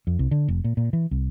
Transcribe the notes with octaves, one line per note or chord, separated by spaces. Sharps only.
F2
C2
D3
F1
A#2
A#2
E3
C2